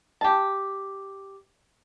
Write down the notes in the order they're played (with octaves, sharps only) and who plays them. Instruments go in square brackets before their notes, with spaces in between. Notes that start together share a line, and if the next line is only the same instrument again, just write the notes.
[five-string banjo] G4 A5